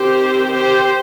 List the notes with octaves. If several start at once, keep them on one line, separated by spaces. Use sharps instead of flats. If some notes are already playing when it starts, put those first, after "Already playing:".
Already playing: D#3 C4 G4 C5
G4 C5